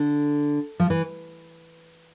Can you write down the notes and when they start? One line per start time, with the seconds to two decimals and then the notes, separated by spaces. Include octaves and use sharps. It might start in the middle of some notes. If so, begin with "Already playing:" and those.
Already playing: D3
0.79 F3
0.90 E3